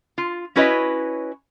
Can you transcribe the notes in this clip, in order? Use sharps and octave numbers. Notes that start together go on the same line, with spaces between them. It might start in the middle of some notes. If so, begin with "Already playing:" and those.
F4
C#4 E4 F#4 B4 C#5 D#5